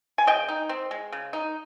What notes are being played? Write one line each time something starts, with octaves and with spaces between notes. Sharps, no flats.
G#5
C#3 D#5 G5
D#4
C4
G#3
C#3
D#4